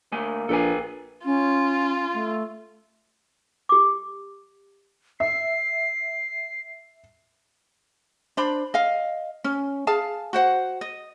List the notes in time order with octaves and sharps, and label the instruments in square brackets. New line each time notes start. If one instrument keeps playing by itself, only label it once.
[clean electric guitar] D2 A3 G#5 [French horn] A#3
[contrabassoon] A#1 [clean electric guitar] A4 B4 G#5
[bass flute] C#4 [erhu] F4
[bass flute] A3
[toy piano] G4 D6
[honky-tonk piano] E5 [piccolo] C7
[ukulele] D4 C5 B5
D#5 F5
C#4
G#4 F5 A5
F#4 C5 F#5
D#5